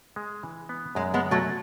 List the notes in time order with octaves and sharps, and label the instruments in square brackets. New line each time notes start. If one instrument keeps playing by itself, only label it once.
[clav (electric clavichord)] G#3
E3
B3
[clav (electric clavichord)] F#2 [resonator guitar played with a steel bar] G#3
[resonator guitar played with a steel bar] G#3 B3
[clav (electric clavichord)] D3
[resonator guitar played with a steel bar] F#3 A3